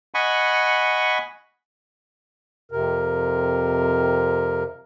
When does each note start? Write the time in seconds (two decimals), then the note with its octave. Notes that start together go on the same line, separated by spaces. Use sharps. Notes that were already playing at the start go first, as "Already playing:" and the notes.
0.14 D#5 F#5 G#5 B5 C#6
2.72 F2 C3 A#4